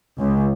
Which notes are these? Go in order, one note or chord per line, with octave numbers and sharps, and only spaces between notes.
C#2